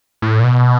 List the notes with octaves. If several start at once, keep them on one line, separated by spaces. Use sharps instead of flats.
A2
A#2
B2